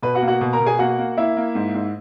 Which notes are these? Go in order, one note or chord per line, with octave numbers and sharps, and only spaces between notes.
B2 B4
F#4 F#5
A#3
F#4 F#5
B2
A#4 A#5
B2
G#4 G#5
A#3 F#4 F#5
A#3
A#3 E4 E5
A#3
G#2
G#2